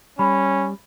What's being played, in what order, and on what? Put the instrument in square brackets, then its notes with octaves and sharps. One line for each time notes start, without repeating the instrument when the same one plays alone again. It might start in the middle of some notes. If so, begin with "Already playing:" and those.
[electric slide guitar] G3 [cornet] C#4 [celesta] B5